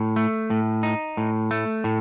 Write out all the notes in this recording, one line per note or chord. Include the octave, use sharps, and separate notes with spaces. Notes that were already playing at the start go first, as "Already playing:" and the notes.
Already playing: A2
A3
A2
D#4
A2
A3
A2